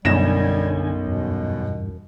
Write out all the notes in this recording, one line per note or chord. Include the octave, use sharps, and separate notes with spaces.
B1 F#2 D3 G3 G#5 A#6 E7
E2 G2 B2